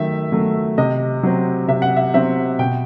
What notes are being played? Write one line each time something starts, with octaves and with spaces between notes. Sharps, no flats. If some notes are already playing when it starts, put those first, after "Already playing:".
Already playing: D#3 F#3 A3 E5
F#3 A3
C3 D#5
F#3 C4
C3 E5
F#5
E5
F#3 C4 E5
B2 G5